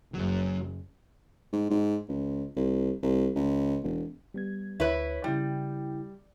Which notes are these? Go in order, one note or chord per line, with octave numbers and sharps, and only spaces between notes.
F#1 F#2 F#3
G#2
G#2
C#2
C2
C2
C#2
E1
G3 B3 G#6
D2 E4 B4 C#5 B6
C#3 G3 E4 G5